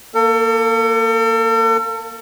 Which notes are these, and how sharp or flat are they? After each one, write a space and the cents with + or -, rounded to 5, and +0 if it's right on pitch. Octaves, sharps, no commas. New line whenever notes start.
A#3 +0 A4 +40